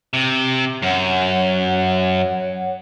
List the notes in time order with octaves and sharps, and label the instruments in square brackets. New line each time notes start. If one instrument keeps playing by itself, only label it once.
[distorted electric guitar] C3
[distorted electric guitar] F#2 [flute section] C#5 F#5